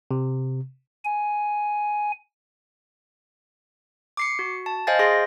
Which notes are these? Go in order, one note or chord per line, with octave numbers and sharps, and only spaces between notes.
C3
G#5
D6 C7 C#7
F#4
A5
C5 D#5 F5 G#5 A6
G#4 C6 A#6